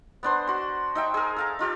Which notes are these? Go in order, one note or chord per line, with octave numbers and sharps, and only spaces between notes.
B3 D4 C5
F#4 C6
D#4 E5 G5
G#4 A#4
A4 F5 A#5
D#4 F4 G4 A4